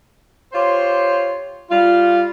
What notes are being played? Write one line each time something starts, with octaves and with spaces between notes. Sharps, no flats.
F4 G4 C5 C#5
G3 F4